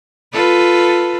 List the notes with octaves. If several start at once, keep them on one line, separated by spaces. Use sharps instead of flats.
F4 A4 B4